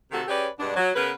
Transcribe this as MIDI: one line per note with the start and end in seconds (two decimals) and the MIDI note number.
0.12 0.24 48
0.12 0.24 51
0.12 0.24 66
0.12 0.24 69
0.28 0.48 61
0.28 0.48 67
0.28 0.48 68
0.28 0.48 71
0.28 0.48 73
0.28 0.48 74
0.59 0.75 43
0.59 0.75 47
0.59 0.75 56
0.59 0.75 62
0.76 0.91 54
0.95 1.12 49
0.95 1.12 59
0.95 1.12 70
0.95 1.12 71